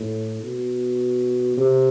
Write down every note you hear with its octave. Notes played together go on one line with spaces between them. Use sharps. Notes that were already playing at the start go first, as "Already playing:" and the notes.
Already playing: A2
B2
C3